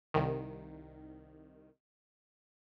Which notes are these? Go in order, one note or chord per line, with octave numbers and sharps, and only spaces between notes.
C2 D#3